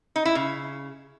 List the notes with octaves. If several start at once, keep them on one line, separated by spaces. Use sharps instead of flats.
D#4
E4
C#3